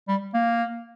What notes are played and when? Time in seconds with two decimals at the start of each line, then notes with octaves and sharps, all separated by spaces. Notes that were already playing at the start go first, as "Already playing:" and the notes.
0.08 G3
0.34 A#3